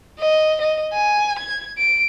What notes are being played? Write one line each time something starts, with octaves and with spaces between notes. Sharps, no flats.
D#5
D#5
G#5
G#6
D7